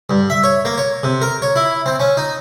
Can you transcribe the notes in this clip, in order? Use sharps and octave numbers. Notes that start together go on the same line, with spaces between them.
G2
E5
C#5
A#3
C#5
C3
A#4
C#5
E4
C4
C#4
D#4